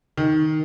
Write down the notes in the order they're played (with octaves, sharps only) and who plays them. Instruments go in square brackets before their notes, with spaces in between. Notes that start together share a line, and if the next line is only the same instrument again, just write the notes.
[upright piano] D#3